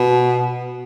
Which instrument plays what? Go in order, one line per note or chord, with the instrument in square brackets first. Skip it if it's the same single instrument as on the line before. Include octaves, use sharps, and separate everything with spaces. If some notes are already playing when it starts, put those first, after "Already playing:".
Already playing: [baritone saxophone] B2